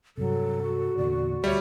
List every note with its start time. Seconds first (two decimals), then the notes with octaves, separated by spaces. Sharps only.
0.18 G2 C3 F#3 A4
0.62 F#4
0.97 E2 A#2 D3 D5
1.44 D2 G3 C#5 E5